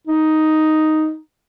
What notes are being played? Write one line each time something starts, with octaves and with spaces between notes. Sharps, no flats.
D#4